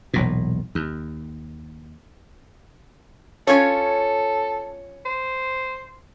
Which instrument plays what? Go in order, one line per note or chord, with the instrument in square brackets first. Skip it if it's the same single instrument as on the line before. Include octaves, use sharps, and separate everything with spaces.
[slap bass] E1 B1 A#2
D#2
[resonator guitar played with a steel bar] C#4 F4 C#5 [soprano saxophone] A4
[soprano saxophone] C5